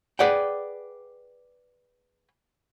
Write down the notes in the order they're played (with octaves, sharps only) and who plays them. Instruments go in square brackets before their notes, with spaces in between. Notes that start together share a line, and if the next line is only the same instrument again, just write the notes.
[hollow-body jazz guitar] G#4 B4 D5 F#5 G5